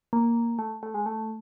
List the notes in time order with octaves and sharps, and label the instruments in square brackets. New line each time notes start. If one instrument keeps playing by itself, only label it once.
[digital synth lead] A#3
A3
A3
G#3
A3